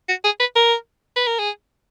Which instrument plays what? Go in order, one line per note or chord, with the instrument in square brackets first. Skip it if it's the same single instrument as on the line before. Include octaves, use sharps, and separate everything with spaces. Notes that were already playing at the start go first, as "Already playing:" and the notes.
[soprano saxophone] F#4
G#4
B4
A#4
B4
A#4
G#4